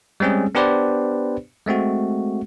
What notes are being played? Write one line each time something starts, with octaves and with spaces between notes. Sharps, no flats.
G3 G#3 C4 C#4 G#4
B3 D4 G4 B4 C5 D5
G#3 A3 C4 F#4